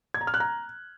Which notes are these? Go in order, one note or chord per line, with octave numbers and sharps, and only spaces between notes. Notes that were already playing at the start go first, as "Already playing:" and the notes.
G#6
A#5
F6
F#6
A#5